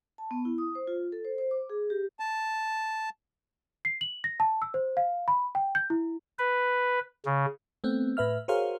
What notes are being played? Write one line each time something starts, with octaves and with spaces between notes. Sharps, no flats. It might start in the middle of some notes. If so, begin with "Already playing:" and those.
A5
B3
E4
D#6
C5
F4
A4
C5
C5
D6
G#4
G4
A5
C7
F#7
A#6
A5
E6
C5
F5
B5
G5
G6
E4
B4
C#3
A3 B3 C4
A2 B4 E5 F6
F#4 G#4 A#4 C5 C#5 F5